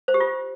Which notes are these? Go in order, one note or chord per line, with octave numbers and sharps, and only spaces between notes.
C5
G4
F4